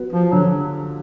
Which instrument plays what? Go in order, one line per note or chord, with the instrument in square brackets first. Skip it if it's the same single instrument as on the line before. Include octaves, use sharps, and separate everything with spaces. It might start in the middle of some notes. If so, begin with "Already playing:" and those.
Already playing: [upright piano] F#3 B3
[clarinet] F3 [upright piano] F4
[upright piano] D3 [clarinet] F#3